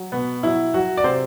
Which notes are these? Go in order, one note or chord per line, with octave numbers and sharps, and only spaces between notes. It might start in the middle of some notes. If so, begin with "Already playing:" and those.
Already playing: F#3
B2 B3
F#3 E4
F#3 F#4
D5
C3 C5